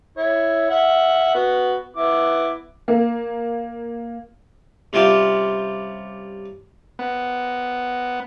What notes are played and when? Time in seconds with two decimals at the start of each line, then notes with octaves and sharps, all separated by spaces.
0.17 E4 C#5
0.70 E5 F#5
1.35 B3 F#4
1.96 B3 E4 D6
2.88 A#3
4.93 C3 G3 C#4 F4 G4
6.99 B3